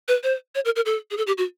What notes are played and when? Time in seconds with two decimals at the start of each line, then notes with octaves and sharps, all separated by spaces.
0.08 B4
0.23 C5
0.55 C#5
0.65 A#4
0.76 A#4
0.86 A4
1.11 G#4
1.17 A4
1.27 G4
1.38 F#4